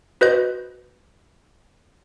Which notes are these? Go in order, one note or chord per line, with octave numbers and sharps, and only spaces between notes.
F#4 B4 C5 D#5 G6